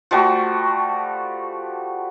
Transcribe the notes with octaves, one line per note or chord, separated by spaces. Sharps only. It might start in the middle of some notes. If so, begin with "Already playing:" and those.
F3 G3 A3 F#4